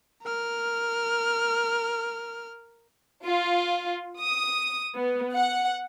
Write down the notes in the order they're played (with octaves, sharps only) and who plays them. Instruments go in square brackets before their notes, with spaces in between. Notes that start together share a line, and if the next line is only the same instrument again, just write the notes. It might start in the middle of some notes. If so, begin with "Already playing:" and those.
[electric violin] A#4 F6
[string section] F4
D#6
B3
F#5